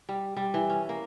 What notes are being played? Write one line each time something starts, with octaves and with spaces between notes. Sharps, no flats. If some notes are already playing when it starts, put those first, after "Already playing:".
G3
G3
E3
C#4
A#3